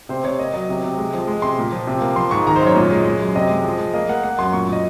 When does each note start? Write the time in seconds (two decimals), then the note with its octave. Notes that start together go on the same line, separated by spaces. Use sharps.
0.09 C3 C5
0.24 C3 C#5
0.39 A#3 D#5
0.53 F#3 D#5
0.69 C3
0.83 C3
0.98 G#3
1.14 F3
1.27 G#3
1.42 C3 C6
1.58 A#2
1.72 F3
1.87 C3
2.01 A#3
2.16 F3 C6
2.31 G#2 C#6
2.47 D#3 A#5
2.56 C5
2.62 F#2 C#5
2.76 A#2
2.91 G#3
3.05 G#3
3.20 F#2
3.36 C3 D#5
3.49 G#3
3.64 F3
3.79 G#3
3.93 A#3 D#5
4.09 A#3 F#5
4.23 A#3 F#5
4.39 F#2 C6
4.53 A#2 C#6
4.68 A#2 D#5